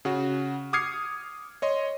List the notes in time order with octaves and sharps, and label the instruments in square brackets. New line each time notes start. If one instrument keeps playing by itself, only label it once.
[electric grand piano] C#3 F#4
D6 D#6 F6 G#6 C7 C#7
C#5 D#5 C6